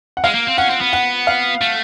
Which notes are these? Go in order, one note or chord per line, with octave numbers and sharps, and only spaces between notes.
F#5
G#3 F5
A#3
C4
C#4 F#5
C4
B3
F#5
F5
A3